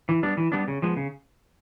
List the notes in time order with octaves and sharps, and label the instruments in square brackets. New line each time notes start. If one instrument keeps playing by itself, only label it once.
[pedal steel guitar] E3
G3 B3 D4
E3
G3 B3 D4
C#3
F3 G#3 B3
C#3